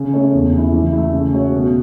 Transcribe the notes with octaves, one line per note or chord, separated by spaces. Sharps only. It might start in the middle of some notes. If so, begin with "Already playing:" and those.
Already playing: C#3
A3 C#4 A4 C#5
E2
C#3 A3 E4
E3
E4
A3
C#3
A3 F#4 C#5
B2